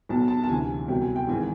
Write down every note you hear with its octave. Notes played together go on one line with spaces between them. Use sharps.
B1 B2 F#3 A5
A5
A5
D2 C3 E3 G#5
C2 B2 F#3 G5
G#5
G5
G#1 G#2 E3 G#5